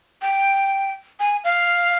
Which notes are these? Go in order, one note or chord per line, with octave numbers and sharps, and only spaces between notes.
G5
G#5
F5